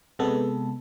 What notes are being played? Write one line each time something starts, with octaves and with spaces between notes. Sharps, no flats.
C3 G#3 B3 A4